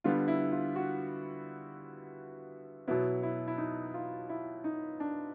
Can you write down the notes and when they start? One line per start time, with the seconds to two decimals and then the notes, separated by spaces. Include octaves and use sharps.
0.04 D3 G3 B3 F4
0.28 E4
0.52 F4
0.76 F#4
2.87 B2 F#3 B3 E4
3.23 E4
3.47 E4
3.58 D#4
3.94 F4
4.29 E4
4.64 D#4
5.00 D4